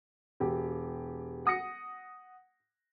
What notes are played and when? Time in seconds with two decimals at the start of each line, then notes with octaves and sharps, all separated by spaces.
0.40 E1 G4
1.46 F#5 D#6 A#6 C#7